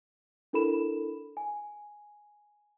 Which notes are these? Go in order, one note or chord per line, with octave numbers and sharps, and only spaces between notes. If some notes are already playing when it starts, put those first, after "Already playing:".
D4 E4 A4 A#4 B5 E7
G#5